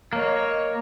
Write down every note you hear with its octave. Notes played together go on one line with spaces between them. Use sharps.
A#3 C#5 D#5